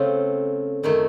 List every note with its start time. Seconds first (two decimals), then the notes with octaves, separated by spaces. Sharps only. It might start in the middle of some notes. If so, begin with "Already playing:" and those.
Already playing: C#3 A3 C4 F4
0.83 F#2 D#3 A3